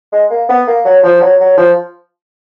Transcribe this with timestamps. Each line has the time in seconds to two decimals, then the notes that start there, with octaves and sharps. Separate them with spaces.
0.12 G#3
0.30 A#3
0.49 B3
0.67 A#3
0.85 F#3
1.04 F3
1.21 F#3
1.40 F#3
1.58 F3